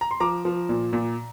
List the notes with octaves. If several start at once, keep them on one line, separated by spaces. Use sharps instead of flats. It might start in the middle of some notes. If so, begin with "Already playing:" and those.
A#5
C6
F3 A#5 D6
F3
A#2
A#2